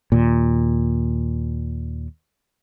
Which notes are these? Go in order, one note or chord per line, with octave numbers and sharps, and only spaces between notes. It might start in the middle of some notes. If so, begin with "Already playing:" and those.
D#2 A#2